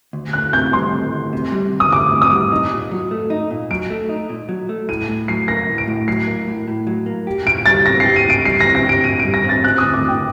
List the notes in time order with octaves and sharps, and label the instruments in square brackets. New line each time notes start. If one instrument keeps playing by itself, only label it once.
[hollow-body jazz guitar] D2
[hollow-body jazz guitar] D2 [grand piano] F#6
[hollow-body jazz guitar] C3 [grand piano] G6
[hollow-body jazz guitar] G3 [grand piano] C6
[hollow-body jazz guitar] D2
D2
C3
G3
D2
[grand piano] D#6
[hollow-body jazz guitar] D2 [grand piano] D6
[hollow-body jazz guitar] C3
[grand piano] D#6
[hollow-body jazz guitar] G3
D#4
A#2
F#3
A3
D#4
A#2
[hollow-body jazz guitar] F#3 [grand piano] D7
[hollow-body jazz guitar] A3
D#4
A#2
F#3
A3
[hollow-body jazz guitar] A2 [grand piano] D#7
[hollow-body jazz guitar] A2
[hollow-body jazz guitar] F#3 [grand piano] C7
[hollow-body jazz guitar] A#3 [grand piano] A#6
[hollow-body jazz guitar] A2
[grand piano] D7
[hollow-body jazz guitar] A2
[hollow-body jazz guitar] F#3 [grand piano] C7
[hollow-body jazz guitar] A#3
A2
A2
F#3
A#3
G4
[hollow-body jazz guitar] A#2 [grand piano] D7
[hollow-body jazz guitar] G3 [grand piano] A6
[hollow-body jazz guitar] C4 [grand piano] A#6
[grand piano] C7
[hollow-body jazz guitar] G4
[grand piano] D#7
[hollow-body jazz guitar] A#2 [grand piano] D7
[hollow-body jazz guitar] G3 [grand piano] C7
[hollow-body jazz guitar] C4 [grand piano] A#6
[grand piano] A#6
[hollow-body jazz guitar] G4 [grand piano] D7
[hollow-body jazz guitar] A#2 [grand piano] D#7
[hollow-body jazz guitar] G3 [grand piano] D7
[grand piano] A#6
[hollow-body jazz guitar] C4 [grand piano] A6
[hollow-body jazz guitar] C4 [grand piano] F#6
[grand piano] D#6
[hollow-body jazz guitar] D2
[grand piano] D6
[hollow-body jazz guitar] D3 [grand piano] G5